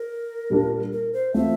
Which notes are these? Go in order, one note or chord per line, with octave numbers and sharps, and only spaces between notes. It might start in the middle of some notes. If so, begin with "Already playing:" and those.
Already playing: A#4
A#2 G3 A#3 D4 F4
A#4
C5
E3 A3 C4 F4 E5